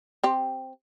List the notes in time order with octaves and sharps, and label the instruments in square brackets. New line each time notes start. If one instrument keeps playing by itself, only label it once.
[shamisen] C4 G4